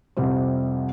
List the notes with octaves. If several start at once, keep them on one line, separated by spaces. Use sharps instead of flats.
C2 F2 C3 G3 C5